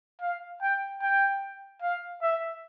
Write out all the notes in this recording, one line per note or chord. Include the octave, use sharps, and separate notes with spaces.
F5
G5
G5
F5
E5